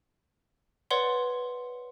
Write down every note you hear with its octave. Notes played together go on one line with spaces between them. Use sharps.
B4 C#5 D5 F#5 C6